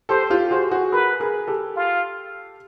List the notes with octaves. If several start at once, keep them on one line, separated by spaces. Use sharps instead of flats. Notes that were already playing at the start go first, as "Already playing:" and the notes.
G4 A4 C5
F4 G4
F#4 G#4 C5
F#4 G#4
G#4 A#4 B4
G#4 A#4
G4 A4
F4